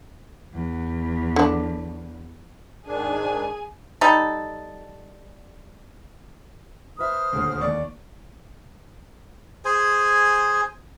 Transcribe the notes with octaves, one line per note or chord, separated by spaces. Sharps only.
E2
D3 D4
G#2 D#3 D4 G#4 G#5
G3 D#4 A4
B4 C5 E5 D#6 F6
D#1 D2
D#2 D5 C#6
G#4 C5 G#5